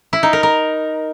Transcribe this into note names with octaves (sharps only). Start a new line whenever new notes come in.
E4
D#4
A#4
A#4